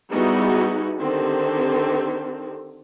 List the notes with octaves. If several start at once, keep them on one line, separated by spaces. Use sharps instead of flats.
G3 B3 D#4 E4 F#4 G#4
D3 D#3 C4 G4